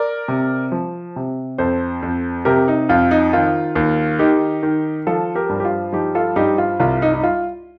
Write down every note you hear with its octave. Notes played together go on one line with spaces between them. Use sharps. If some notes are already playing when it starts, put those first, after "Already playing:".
Already playing: A#4 D5
C3
F3
C3
F2 A4 C5
F2
C3 G4 A#4
D#4
F2 F4
D#4
D#3 F4
D#2
D#3 D#4 G4
D#3
F3 F4 A4
G4 A#4
G2
G4
F4
F3 D#4 G4
F4 A4
G2 D#4 G4
F4
C2 F4
D#4
D#4
F4